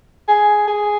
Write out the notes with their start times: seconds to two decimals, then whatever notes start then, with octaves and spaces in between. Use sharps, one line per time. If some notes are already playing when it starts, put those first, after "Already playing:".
0.28 G#4
0.68 G#4